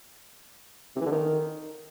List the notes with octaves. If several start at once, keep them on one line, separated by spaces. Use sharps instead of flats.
C3
E3
D3
D#3